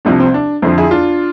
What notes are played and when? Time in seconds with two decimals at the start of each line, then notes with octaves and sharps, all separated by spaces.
0.05 C2 C3 F3 D4
0.20 C4
0.34 D4
0.62 F2 D3 F3 C4 E4
0.78 E4 G#4
0.91 D4 F4